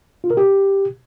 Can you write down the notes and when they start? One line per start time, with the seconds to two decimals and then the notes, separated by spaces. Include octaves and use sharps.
0.24 F4
0.31 A#4
0.37 G4